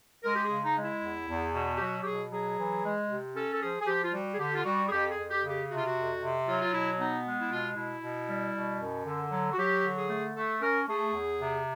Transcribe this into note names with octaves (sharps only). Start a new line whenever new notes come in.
G#3 A#4
G4
G#4
C#3
D#4
G#3
E4
E2
E2
B2
G4
F#3 F#4
G4
B2 G#4
F#3 G#4
E3
G#3
C3
C#4 A4
A4
F3 G#4
G#4
F3 G4
F4
G3 F#4
G#4
D3 G4
F4
G3 F#4
G#4
F2 G4
G#4
F2
G4
C#3
G4
C3 F#4
F4
F#4
F2
C3
F#3 F4
F4
B2 E4
B3 D#4
G#3
E4
B2 F4
B2 E4
B2
G3
B2
F#2
D3
F#3
F#4
F#3 G4
D3
G#4
A3
A3 A4
C#4 A#4
A3 G#4
E2
C3